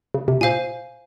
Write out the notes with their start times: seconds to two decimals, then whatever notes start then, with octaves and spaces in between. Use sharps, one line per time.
0.14 C#3
0.28 C3
0.41 A#2 C5 F5 G#5